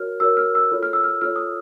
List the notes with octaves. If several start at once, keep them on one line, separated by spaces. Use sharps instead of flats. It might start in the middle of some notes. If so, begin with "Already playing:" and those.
Already playing: F#4 A#4 C#5 F6
F#4 A#4 C#5 E6
F6
E6
F4 A4 C#5
F6
E6
F6
F4 A4 C#5 F6
D#6